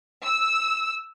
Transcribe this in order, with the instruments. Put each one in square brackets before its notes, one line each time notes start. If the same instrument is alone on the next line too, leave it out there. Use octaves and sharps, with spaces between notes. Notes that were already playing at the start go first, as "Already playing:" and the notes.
[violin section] E6